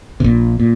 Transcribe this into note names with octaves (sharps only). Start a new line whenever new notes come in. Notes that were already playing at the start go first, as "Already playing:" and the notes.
C3
A#1 A#2
A#2